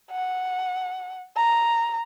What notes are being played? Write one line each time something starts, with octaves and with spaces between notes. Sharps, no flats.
F#5
A#5